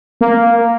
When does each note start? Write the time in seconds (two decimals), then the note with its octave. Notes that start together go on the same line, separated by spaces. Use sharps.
0.21 A#3